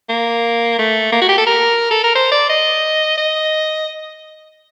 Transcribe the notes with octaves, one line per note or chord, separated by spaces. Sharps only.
A#3
A3
A#3
F#4
G4
A4
A#4
A4
A#4
C5
D5
D#5
D#5